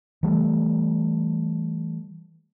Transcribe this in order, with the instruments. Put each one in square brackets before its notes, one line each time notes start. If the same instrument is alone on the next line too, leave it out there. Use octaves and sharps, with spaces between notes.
[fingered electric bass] E3 G3 A3